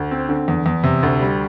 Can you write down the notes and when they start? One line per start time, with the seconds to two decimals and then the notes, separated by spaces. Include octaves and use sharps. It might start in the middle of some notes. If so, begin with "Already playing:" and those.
Already playing: D2
0.11 C4
0.29 D3
0.48 E2
0.66 E2
0.84 C3
1.03 D2
1.21 G3